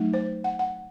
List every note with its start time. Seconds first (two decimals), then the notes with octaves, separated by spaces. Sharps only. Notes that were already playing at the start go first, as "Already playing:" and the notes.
Already playing: F#3 A3 D#4
0.14 C5
0.44 F#5
0.59 F#5